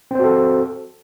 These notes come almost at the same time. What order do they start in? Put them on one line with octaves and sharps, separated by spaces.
C4 C5 F#4 A4